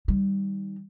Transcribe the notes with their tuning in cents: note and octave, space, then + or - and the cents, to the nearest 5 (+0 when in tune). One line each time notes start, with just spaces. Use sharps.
D#3 +10 G3 +0